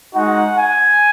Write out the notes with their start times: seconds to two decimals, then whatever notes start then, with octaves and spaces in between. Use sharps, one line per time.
0.14 G#3 D#4 F#4 F#5
0.55 G#5